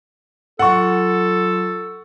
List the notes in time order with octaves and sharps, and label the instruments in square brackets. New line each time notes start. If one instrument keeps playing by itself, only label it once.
[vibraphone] F#3 F4 C6 [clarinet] A4 [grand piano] F#5 C#6